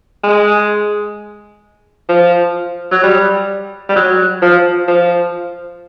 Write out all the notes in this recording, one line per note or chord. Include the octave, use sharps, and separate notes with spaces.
G#3
F3
F#3
G3
G3
F#3
F3
F3